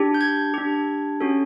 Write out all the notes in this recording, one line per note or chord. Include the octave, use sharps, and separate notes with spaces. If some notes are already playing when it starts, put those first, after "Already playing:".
Already playing: D4 G4
G6
G#6
D4 G4
C#4 F#4 A4